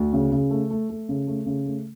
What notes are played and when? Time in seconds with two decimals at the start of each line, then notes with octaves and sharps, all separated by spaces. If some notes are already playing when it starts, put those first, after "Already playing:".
Already playing: D2
0.13 C#3
0.32 C#3
0.50 A3
0.70 A3
0.89 A3
1.09 C#3
1.27 A3
1.46 C#3
1.66 A3